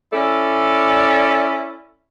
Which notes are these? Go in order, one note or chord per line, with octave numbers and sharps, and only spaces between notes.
C#4 E4 A4 D5